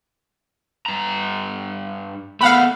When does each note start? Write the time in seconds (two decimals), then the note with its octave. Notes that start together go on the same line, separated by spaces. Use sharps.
0.86 G2 A#5
2.41 A3 B3 F5 F#5 B5